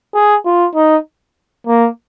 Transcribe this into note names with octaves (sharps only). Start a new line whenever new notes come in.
G#4
F4
D#4
A#3